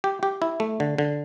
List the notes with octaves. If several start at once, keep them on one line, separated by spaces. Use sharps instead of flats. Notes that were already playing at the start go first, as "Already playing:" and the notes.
G4
G4
E4
A3
D3
D3